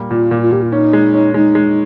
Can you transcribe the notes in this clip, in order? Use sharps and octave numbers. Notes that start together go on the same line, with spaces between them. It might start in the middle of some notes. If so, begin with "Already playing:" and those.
Already playing: A#2 G3 A#3
A#2 F4
A#2
F4
A#2 G4
F4
C#4 D#4
G#3
C#4
G#3 D#4
G#3